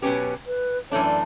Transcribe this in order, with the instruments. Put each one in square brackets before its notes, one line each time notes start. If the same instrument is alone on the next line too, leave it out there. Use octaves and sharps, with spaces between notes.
[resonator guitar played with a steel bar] B2 F#3 C#4 G4 [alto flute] B4
[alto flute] B4
[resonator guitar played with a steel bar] F#2 E3 A3 D4 [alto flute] C#5
[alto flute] D5